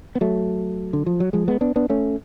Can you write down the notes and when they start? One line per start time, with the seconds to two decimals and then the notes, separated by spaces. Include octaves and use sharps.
0.15 B3
0.21 F#3 A3
0.93 D3
1.06 F3
1.20 F#3
1.33 F3 G#3
1.48 G#3 B3
1.61 B3 D4
1.76 B3 D4
1.90 A3 C#4